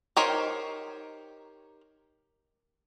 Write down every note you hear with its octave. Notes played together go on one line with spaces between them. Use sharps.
D#4 G4 A#4 C5 C#5